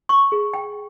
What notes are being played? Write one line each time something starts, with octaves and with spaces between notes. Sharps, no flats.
C#6
G#4
G5